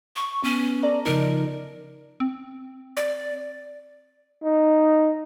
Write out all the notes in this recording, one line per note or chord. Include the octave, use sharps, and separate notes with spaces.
C#6
B3 C#4
A4 D5 A#5
C#3 F3 D#4 A#4
C4
D5
D#4